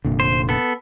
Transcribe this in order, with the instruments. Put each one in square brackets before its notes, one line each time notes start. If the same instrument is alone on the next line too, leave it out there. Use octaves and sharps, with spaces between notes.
[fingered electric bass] F1 A#2 D3
[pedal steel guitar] C5
B3 A4